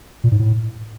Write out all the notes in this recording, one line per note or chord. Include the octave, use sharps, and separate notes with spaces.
A#2
G#2
A2